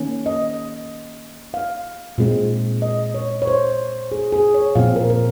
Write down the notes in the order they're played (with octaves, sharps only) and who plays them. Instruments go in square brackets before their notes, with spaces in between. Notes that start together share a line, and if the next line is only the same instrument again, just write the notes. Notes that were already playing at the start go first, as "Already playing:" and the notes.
Already playing: [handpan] D#3 A#3 C#4
D#5
F5
A#2 G#3 C4
D#5
C#5
C#5
C5
G#4
G#4
C#5
A#2 F3 C4 F5
A#4
A#4